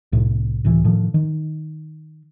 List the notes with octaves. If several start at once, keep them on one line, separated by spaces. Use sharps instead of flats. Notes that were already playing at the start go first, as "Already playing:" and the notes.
C2 A2 C3
C#2 A2 E3
A2 D#3 F3
D#3